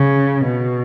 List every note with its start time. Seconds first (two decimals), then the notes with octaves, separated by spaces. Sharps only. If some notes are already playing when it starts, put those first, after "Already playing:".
Already playing: C#3
0.45 B2